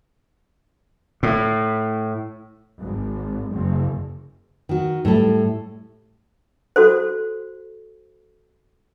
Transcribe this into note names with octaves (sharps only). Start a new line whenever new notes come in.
A2
G#1
F#1
D#3 F#4
A2 G3 A4
F#4 A4 C5